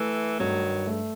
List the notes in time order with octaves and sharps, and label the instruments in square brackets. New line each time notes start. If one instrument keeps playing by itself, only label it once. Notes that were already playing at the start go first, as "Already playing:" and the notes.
Already playing: [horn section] E3 [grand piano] A3
[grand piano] G2 [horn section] D#3 F#3
[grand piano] A3